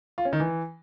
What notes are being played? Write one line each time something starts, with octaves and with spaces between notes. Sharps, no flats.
F4
C#4
D#3
E3